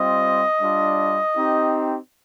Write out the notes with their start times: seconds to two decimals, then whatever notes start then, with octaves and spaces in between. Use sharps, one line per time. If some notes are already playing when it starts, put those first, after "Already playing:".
Already playing: G3 C4 F4 D#5
0.60 G3 D4 F4
1.36 C4 D#4 G4